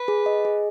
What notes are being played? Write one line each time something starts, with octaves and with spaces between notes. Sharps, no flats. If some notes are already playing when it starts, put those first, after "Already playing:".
Already playing: B4
G#4
D#5
G#4